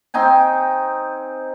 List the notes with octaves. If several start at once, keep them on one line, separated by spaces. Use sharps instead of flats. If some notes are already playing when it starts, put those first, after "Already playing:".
C4 D#4 G5 G#5